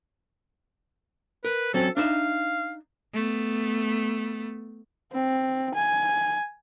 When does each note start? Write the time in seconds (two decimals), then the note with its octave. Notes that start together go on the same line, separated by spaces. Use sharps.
1.45 A#4 B4
1.74 F#3 C4 C#4 A4
1.97 D4 D#4 E5 F5
3.13 A3 B3
5.13 C4
5.75 G#5